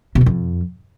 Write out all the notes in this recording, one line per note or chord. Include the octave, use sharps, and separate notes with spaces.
B2
E2
F2